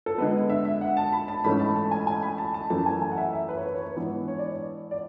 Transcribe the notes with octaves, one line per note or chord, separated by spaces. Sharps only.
A4
D3 G#3 B3 B4
E5
E5
F#5
A5
B5
A5
G#2 E3 A3 C#4 B5
A5
A5
G#5
G#5
B5
A5
A5
F#2 E3 A3 A5
G#5
G#5
F#5
E5
E5
B4
C#5
B4
C#5
B4
G#2 E3 B3 D4
C#5
D5
C#5
D5